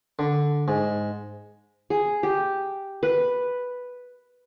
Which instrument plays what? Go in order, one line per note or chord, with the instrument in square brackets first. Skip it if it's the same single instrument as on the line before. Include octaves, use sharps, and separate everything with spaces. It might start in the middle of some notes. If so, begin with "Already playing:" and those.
[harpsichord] D3
G#2
[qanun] G#4
G4
B4